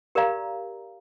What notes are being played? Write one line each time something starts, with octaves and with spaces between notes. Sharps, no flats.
G4 A#4 D5 F5 A#5